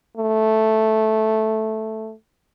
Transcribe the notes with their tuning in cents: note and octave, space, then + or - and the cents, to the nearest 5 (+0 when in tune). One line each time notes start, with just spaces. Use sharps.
A3 -5